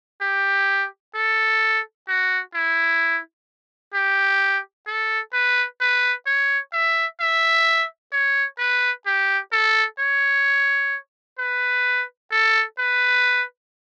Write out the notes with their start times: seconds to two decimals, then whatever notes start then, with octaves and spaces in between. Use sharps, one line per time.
0.21 G4
1.15 A4
2.08 F#4
2.54 E4
3.94 G4
4.87 A4
5.33 B4
5.81 B4
6.26 C#5
6.73 E5
7.20 E5
8.12 C#5
8.58 B4
9.06 G4
9.52 A4
9.99 C#5
11.39 B4
12.31 A4
12.78 B4